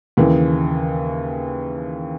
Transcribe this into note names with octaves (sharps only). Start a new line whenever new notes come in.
D#2 C#3 E3